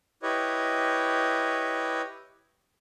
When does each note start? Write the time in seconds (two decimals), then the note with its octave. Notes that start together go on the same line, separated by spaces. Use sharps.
0.23 E4 G4 B4 C#5 D#5